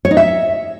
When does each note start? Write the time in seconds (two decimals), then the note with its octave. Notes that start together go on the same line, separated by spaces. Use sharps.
0.05 C#5
0.11 D#4
0.17 E5